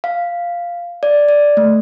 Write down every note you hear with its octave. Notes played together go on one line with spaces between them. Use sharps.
F5
D5
D5
A3